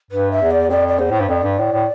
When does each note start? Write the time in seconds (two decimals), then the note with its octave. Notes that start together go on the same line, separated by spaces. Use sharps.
0.11 G2 B4
0.31 E5
0.41 E2
0.51 D5
0.70 F2 D5
0.88 D5
0.99 E2 C5
1.10 A2
1.20 G2
1.29 F2 D5
1.44 G2
1.59 A2
1.72 A2